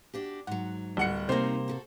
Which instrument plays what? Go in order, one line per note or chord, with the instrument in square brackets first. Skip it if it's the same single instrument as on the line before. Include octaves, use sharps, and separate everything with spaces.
[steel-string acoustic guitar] D4 F#4 G4
[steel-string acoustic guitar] G#2 F#3 [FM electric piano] F#5
[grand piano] D1 F#5 C#7 [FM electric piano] G3
[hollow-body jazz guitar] C3 A#3 [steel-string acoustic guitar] C4 C#4 D#4 [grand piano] C5
[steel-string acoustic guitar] F#4 G4 A4